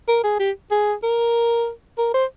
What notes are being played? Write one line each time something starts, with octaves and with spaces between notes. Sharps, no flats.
A#4
G#4
G4
G#4
A#4
A#4
C5